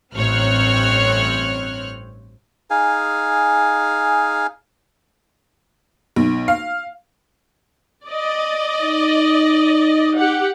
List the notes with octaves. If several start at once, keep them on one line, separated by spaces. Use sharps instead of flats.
A1 G2 C4 C#5 F6 F#6
D#4 G#4 F5 G#5
B1
F5
D5 D#5
D#4
G4 F#5